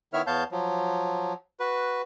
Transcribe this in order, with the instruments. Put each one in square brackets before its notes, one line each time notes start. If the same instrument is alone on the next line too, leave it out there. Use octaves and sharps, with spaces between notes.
[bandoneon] D#3 B3 E4 C#5 E5 F6
E2 B3 C#5 F5 A5 G6
F3 F#3
F#4 B4